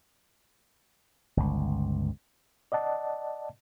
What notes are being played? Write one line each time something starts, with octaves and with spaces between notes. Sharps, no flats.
G1 C#2
D5 D#5 F#5 A5